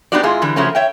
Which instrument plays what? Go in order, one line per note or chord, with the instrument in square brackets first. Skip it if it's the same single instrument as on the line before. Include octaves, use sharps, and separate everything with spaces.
[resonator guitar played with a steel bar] B3 D4 D#4 F#4 G4 D5
G#2 E4 F4 G#4
D3 E3 G3
C#3 F3 F#3 A3 A#3 C#4
C#5 E5 G5